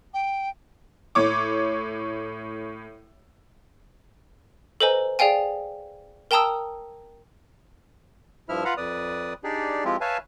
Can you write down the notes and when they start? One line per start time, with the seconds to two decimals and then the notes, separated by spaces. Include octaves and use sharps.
0.13 G5
1.15 A2 C#5 D6
4.81 A4 B4 C5 D#5 G#5 A#5
5.19 G#4 D5 F5 G5 G#5
6.31 A#4 G5 A5 A#5 D#6 E6
8.49 G2 F3 E4 E5 F6
8.65 F4 B4 F5 F#5 A#5 B5
8.77 F2 B4 D5 D#6
9.44 D4 D#4 G4 G#4 D5
9.85 F3 G#3 C4 E4 F4 G4
10.01 B4 C#5 E5 F5 G#5 A5